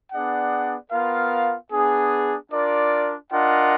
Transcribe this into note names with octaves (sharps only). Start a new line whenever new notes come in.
B3 D4 G#4 D5 F#5
B3 F4 A#4 F5
B3 D4 G#4
D4 F4 A#4 D5
D4 F4 A#4 D#5 F#5